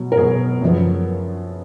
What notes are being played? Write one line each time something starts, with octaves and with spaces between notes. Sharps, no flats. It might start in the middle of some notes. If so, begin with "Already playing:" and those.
Already playing: B2 F#3
A#4
B2 F#3 B3 G#4
F#2 C#3 F3 B3